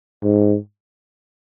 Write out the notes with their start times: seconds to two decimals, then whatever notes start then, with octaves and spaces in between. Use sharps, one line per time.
0.23 G#2